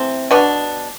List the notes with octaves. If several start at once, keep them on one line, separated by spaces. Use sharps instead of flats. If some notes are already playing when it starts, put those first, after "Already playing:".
Already playing: E3 A3 C4
B2 B3 D4